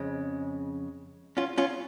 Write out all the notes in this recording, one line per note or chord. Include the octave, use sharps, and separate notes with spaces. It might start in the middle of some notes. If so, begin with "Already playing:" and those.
Already playing: F2 C#3 G#3
C#4 F4
C#4 F4